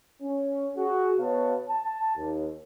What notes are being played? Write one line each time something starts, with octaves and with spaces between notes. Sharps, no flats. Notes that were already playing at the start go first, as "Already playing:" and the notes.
C#4
F#4 G#4
B2 B3 F#4 C#5 F5 A5
A5
D#2